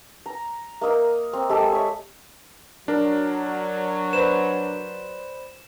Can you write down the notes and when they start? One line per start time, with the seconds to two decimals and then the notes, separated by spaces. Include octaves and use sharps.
0.26 A#5
0.81 A#3 A#4 D#5 E6
1.33 C4
1.49 G#3 G4 A4
1.72 C#5 E5
2.88 F#3 D4 A#4
4.13 B4 C5 D5 E7